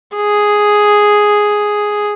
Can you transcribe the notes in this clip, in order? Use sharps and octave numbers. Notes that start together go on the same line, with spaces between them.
G#4